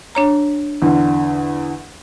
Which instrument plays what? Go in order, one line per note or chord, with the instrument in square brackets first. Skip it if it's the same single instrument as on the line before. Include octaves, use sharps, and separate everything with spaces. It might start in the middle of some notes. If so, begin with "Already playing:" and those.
[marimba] D4 C#5 A#5
[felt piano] E2 D3